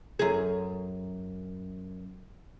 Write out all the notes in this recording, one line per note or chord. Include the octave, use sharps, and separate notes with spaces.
F#2 G#4